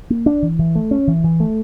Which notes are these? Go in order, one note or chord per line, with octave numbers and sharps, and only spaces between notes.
A#3
D4
E3
E3
A3
C#4
E3
E3
A3